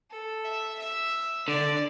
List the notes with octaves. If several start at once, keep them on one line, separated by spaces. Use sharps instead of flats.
A4
E5
E5
D3 D5